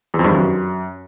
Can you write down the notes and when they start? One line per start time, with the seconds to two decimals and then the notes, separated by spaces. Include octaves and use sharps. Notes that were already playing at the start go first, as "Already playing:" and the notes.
0.14 E2
0.19 F2
0.24 G2
0.29 D#3
0.35 F#2